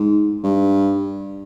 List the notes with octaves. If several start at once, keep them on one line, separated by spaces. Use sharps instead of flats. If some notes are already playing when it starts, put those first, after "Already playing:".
Already playing: G#2
G2